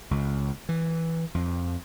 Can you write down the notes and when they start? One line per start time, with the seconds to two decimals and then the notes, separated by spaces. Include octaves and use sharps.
0.11 C#2
0.69 E3
1.35 F2